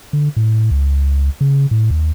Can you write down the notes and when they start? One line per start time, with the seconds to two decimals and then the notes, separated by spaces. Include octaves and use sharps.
0.13 D3
0.37 A2
0.71 C#2
1.41 C#3
1.71 A2
1.91 D#2